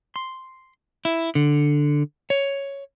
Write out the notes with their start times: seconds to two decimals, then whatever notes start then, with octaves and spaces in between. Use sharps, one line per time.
0.16 C6
1.05 E4
1.35 D3
2.30 C#5